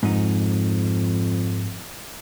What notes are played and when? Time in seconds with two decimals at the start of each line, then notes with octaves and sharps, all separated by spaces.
0.03 F2 G#2 D#4